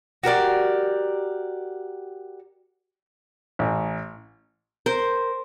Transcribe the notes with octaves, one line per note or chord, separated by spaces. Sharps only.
F#4 G4 A#4 D5
A1
A#4 C5